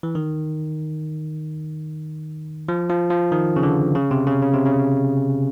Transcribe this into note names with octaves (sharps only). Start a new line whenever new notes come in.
E3
D#3
F3
F3
F3
D#3
C#3
D3
C#3
C3
C#3
C#3
C3
C#3